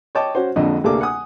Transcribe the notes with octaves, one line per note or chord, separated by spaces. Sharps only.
C#5 D#5 G5 A5 D6
C#4 F#4 C5
A#1 F2 D3 D#5
D2 C3 A#3 G#4 A4 D6
F#5 G#5 D#6